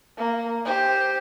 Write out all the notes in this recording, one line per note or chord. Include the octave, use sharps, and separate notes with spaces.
A#3
G4 C5